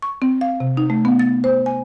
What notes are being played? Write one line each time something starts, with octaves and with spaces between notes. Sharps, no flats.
C#6
C4
F5
C3
D#4
A3
B3
A6
C5
G#5